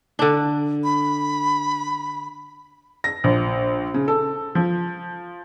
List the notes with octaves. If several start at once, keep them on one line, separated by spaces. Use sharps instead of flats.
D3 D4
B5
A#6
A#1
C#3
A4
F3